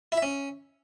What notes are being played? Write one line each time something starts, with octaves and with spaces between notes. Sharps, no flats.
E4
E5
C#4